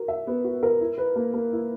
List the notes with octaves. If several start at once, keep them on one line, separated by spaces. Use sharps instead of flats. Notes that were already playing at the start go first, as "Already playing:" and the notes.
Already playing: F#4 A#4
E5
B3
F#4
A#4
E4
B4
A#3
A#3
E4